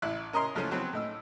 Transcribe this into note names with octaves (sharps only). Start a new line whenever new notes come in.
A1 E4 F#6
C#4 A#4 D#5 A#5 C6
C#2 F3 A3 C#4
F#3 B3 C4
A2 D#4 E6